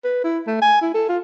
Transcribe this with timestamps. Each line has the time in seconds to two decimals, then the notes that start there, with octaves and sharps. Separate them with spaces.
0.04 B4
0.24 E4
0.47 A3
0.62 G#5
0.81 E4
0.94 A4
1.09 F4